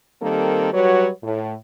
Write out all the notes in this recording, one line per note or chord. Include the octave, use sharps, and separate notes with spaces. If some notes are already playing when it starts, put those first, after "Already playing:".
D#3 G3 A#3 C4 A4
F#3 G3 F#4 B4 C#5
A2